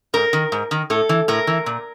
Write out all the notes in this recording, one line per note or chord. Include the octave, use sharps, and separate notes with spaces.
G#2 A#4
D#3
G#2
D#3
A2 A4
E3
A2 A#4
E3
A#2